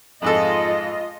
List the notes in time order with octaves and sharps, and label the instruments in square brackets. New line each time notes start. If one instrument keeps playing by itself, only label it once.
[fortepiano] F2 G#2 A4 [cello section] F4 D#5